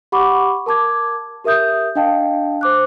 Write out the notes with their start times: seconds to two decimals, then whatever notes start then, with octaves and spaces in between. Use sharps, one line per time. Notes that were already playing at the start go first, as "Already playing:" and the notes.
0.12 G4 F#5 B5 C#6 D6
0.66 A#4 A5 D6 G#6
1.44 G4 A#4 E5 D#6 G6
1.95 D4 D#5 F5 G5 A5
2.61 C5 D6 F#6